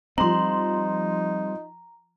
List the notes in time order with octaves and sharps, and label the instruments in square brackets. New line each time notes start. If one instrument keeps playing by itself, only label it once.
[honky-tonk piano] F3 C6 F#7 [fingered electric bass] G3 C4 [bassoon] D#4 [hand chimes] A#5